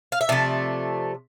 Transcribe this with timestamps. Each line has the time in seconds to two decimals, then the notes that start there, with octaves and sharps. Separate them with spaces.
0.12 F5
0.21 E5
0.29 C3 F3 A3 D5